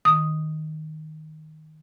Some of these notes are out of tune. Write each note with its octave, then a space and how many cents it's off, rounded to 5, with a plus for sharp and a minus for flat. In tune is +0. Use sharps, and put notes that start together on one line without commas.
D#3 +0 D#6 +0